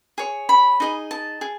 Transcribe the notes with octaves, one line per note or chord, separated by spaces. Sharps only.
G#4 C#5
B5
D#4 G#4 D#5
A5
G#4